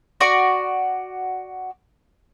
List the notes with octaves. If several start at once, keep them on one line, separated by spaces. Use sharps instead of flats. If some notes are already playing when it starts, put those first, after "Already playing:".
F#4 D5 C#6